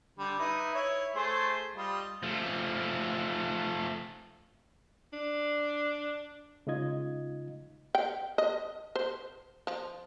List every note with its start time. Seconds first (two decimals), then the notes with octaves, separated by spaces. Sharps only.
0.19 D3 G3
0.39 D#4 E4 B4
0.75 E4 C#5
1.16 A3 G#4 C5
1.76 G3 F4 D#5
2.23 F3 A3
5.13 D4
6.67 C#3 G#3 D#4 F4 D#5 G#6
7.95 G5
8.38 D#5
8.96 C5
9.67 F3